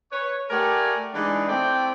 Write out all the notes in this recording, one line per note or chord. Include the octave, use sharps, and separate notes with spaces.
B4 C#5
A3 G4 A#4 D5 F#5 G#5
E3 G#3 D4 D#4 G#4 D5
A3 C4 E4 D5 G5